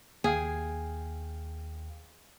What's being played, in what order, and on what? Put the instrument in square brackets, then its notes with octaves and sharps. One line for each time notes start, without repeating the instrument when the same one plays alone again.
[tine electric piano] D#2 F5 G5 [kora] G#4